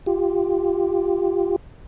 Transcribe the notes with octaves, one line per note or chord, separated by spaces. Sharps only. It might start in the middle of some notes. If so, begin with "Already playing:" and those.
F4 G4